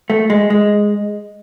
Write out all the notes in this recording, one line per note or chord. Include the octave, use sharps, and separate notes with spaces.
A3
G#3
G#3